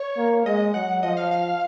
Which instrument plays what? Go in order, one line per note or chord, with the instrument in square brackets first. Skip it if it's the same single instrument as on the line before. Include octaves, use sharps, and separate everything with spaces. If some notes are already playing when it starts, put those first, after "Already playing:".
Already playing: [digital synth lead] C#5
[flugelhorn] A#3
[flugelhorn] G#3 [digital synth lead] D#5
[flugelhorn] F#3 [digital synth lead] F#5
[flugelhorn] F3 [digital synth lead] D#5
[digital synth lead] F5
F5